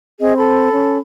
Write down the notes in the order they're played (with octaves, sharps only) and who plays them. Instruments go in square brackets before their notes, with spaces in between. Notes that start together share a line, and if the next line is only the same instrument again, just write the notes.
[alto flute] C4 [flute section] G#4 D#5
[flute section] A4 B5
[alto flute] C#4